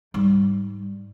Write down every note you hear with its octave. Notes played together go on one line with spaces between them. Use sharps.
G#2 G3